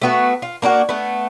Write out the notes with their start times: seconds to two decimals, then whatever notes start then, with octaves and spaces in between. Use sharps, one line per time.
0.01 A3 B3 F#4
0.42 F4
0.62 A#3 D4 D#4 F#4
0.89 A3 B3